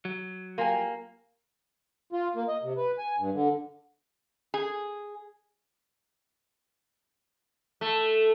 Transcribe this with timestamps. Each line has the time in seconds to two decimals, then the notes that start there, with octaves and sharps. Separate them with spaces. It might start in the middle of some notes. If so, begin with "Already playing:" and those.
0.05 F#3
0.58 A#3 F4 G4 G#5
2.13 F4
2.35 A#3
2.48 D#5
2.63 C3
2.77 B4
2.98 G#5
3.18 G2
3.34 D3
4.54 G#4
7.81 A3